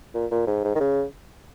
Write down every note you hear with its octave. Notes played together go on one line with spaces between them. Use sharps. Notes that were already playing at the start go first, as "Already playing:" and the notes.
A#2
A#2
G#2
G#2
D#3
C#3